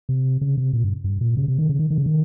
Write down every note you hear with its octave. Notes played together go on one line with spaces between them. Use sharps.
C3
C#3
C3
A#2
G2
G2
A#2
C#3
C3
D#3
C#3
D#3
D#3
C#3
D#3